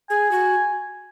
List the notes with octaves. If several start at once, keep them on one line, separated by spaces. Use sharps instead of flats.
G#4 G#5
F#4